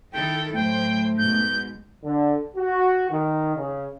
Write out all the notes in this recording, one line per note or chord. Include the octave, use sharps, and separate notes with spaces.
D#3 E4 A4 G5
A2 F#3 A3 C5 G5
G#2 B2 G6
D3
F#4
D#3
C#3